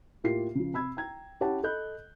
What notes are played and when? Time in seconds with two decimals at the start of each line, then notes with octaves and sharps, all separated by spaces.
0.24 A2 A#3 F4 G4 C7
0.55 C#3 F3
0.73 C3 B5 E6 G#6
0.97 G5 A#5 G#6
1.40 C#4 E4 G4 C#5 F#5 A5
1.63 A4 D#5 B5 F#6 G6